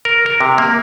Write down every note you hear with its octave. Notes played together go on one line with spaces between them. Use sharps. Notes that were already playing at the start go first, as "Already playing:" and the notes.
A#4
A#4
C3
A#3